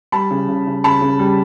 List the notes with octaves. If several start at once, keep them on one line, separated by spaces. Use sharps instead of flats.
G3 A5 B5
C#3
C#3
C#3
C#3 A5 B5
C#3
G3